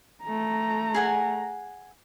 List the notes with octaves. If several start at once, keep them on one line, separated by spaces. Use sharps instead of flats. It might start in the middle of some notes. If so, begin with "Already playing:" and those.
A3 A#5
G#4 F#5 G#5